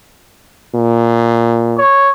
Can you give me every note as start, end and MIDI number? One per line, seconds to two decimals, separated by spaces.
0.74 1.78 46
1.78 2.11 73